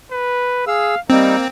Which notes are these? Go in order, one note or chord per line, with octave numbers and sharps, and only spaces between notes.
B4
G#4 F5 E6
G3 A#3 C4 D#4